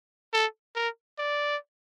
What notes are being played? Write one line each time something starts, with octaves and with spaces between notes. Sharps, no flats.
A4
A#4
D5